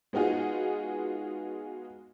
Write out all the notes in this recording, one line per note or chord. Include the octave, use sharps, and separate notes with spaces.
G#3 B3 D#4 F4 F#4 G#4